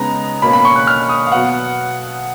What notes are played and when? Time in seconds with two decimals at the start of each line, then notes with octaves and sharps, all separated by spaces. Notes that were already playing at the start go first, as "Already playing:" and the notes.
Already playing: C#3 G#3 B3 D#4 A#5
0.42 B2 A#3 C#4 B5
0.53 B5
0.65 C#6
0.76 F#6
0.87 F6
1.09 D#6
1.27 F5
1.32 B2 F#3 B3 F#5